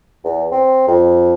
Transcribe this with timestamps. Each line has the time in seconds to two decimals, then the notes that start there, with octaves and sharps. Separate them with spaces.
0.24 E2
0.52 C4
0.88 F2